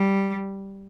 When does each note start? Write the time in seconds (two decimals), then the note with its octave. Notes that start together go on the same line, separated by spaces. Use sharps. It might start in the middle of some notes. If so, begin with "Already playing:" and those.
Already playing: G3